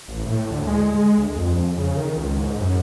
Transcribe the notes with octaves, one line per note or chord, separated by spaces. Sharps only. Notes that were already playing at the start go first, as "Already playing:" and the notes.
A1
A2
D2
G#3
G#3
D2
F2
C#3
D#3
C#2
G#2
F#2